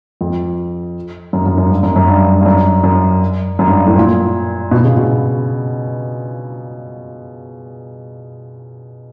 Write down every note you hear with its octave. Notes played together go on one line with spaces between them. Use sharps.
F2
F#2
F#2
F#2
G2
F#2
F#2
G2
G2
F#2
F#2
F#2
G2
A2
A#2
B2
C#3
B2